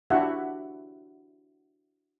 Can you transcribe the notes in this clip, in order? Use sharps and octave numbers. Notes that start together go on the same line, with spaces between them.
D4 E4 F#4 G4 E5 F#5